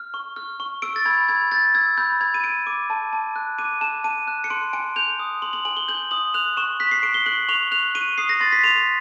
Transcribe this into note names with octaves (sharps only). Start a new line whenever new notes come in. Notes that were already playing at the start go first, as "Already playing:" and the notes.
Already playing: F6
C#6
F6
C#6
E6 D7
A6
B5 G#6
B5 G#6
G6 A6
E6 G#6
B5 G6
B5 G#6
D#7
G6 D7
D6
A5
A5
F#6
D6 D#7
A5 E7
A5 D#7
F#6
C#7
C6 D7
G#5 D7
G6 F7
D#6
C6 F#7
F#7
G#5 F#7
G7
G6 F#7
D#6 F#7
F#6 F7
C#6 E7
F#6 B6
C7
C#6 D7
G7
F#6 F#7
C#6 F7
F#6 F7
C#6 D#7
D#6 C7
A#6
C6 A6
B6
C6 F7